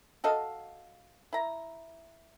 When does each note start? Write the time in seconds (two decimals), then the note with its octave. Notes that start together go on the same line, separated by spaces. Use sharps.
0.24 F#4 A4 D#5 F5
1.33 E4 A#5